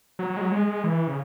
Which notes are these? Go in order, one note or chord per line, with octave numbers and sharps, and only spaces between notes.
F#3
F#3
G#3
F#3
G#3
G#3
E3
C#3